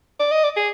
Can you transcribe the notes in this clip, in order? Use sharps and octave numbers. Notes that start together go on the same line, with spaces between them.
D5
D#5
D5
G#4